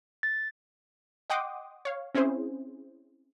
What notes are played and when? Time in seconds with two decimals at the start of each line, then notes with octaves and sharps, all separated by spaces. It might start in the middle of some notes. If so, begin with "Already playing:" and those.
0.23 A6
1.30 D#5 F#5 G5 C6 D6 D#6
1.85 C#5 F5
2.15 C4 C#4 E4 G#4 C5